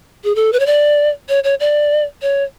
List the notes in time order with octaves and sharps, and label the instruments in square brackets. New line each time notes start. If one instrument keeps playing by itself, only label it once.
[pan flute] G#4
A4
B4
C#5
D5
C#5
C#5
D5
C#5